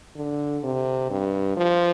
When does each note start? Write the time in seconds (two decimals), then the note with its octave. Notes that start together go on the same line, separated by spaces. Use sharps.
0.16 D3
0.63 C3
1.10 G2
1.57 F3